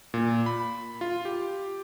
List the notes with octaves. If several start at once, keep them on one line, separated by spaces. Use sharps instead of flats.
A#2
B5
F4
G4